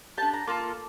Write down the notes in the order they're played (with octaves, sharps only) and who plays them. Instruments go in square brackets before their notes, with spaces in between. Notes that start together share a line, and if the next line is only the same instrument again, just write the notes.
[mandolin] D4 G4 A5
A#5
A#3 F4 A4 D6